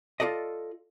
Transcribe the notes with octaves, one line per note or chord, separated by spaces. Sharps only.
F4 G4 A4 D5 D#5